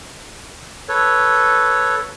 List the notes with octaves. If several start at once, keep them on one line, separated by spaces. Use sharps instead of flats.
A4 B4 C#5